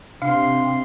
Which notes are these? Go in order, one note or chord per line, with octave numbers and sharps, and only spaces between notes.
C3 D4 F5 C6